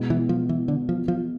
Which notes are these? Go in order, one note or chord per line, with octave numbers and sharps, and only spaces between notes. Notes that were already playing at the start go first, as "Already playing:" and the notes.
Already playing: B2 G#3 B3 E4
E3
F3
E3
D3
F3
F3